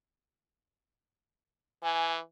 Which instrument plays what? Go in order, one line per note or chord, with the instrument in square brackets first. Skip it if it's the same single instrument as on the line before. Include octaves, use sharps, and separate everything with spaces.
[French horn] E3 [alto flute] G#5